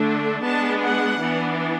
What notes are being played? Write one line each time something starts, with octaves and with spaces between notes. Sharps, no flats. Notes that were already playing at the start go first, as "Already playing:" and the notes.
Already playing: D3 A3 D4
G#3 B3 D4 A5
F#5
E3 B3 D4